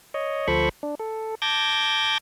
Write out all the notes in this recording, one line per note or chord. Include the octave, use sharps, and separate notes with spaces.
C#5 D#5
D2 F3 A4 C5 B5 C#6
D4
A4
A5 D6 G6 G#6 A#6